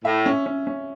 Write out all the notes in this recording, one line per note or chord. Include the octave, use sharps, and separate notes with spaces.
A2 E5
C#4
C#4
C#4